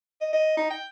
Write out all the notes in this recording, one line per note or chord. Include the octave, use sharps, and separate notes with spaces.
D#5
D#5
D#4
G5